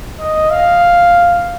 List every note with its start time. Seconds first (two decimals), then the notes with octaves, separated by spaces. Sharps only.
0.20 D#5
0.50 F5